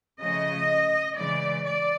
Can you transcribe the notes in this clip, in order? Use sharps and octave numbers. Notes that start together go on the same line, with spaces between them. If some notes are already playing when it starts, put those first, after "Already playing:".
C#3 F3 A3 D#5
C#3 E3 G#3 D5
D5